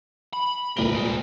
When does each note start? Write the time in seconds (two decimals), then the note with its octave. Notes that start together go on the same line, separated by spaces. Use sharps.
0.33 B5
0.77 D#1 C2 A#4 B4 G7
0.95 G3 G#3